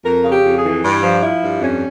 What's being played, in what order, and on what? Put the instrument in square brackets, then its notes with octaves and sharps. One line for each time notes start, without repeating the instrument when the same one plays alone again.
[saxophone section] F2 A#4
C#3
G4
F2
G#4
E3
G2
F3
F3 E4
G2
F2 C#4